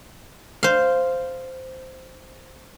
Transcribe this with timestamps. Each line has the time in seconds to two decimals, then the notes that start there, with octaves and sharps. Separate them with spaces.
0.63 C5 F5